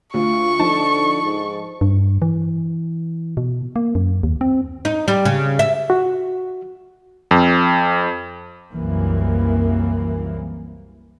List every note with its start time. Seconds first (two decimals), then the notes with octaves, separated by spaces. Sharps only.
0.14 D2 F4 C#6
0.59 D3 F3 D#4 A5
1.23 G#2
1.81 G2
2.22 E3
3.37 B2
3.76 A#3
3.95 F#2
4.23 D#2
4.41 C4
4.85 D#4
5.08 G3
5.25 C#3
5.59 E5
5.90 F#4
7.31 F2
8.73 C2 F#2 E3 A#3